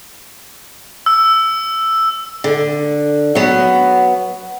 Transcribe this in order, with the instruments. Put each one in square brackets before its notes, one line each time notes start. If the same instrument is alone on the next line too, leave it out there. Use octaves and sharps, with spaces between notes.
[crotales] E6
[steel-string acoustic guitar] D3
F#3 B3